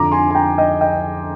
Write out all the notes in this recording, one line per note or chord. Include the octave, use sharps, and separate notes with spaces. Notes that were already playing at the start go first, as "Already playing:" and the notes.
Already playing: F2 D3 F3 A#5 D6
G#5 C6
G#5
G5 A#5
D#5 G5
D#5 G5